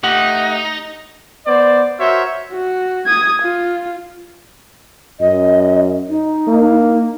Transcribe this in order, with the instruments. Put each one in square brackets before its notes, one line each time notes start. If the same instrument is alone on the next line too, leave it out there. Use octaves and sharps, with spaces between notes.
[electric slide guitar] A3 G4 F#5 [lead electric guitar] D#4
[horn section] B3 C5 D5
F#4 A#4 C5 C#5 E5
[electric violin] F#4
D#6 G#6
F4
[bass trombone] F#2 [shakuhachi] D#5
[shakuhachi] D#4
[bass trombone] A#3